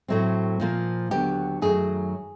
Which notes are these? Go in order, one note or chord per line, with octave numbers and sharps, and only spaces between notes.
A2 F#3 A3 C4
A#2 F3 A#3
D#2 D3 F#3 B3 G4
F#2 D#3 F#3 A3 G#4